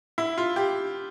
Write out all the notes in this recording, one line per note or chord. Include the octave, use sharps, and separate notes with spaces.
E4
F4
G4